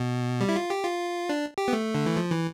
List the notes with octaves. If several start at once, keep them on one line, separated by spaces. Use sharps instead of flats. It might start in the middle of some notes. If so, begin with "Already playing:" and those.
Already playing: B2
G3
E4
F4
G4
F4
D4
G4
B3
A3
D3
E3
F3
E3